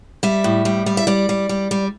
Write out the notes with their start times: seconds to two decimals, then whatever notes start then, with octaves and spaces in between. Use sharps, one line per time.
0.23 G3 E5
0.44 A2
0.65 G3
0.86 G3
0.97 E5
1.07 G3 D5
1.29 G3
1.49 G3
1.71 G3